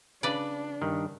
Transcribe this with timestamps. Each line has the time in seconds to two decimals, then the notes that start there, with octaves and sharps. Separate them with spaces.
0.23 C#3 D4 B4 D5
0.81 G2 D#3